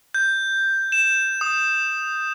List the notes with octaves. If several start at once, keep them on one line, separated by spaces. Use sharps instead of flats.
G6
E7
D#6